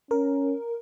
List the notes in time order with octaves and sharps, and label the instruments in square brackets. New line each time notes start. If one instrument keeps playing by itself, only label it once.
[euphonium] C#4 [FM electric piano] A#4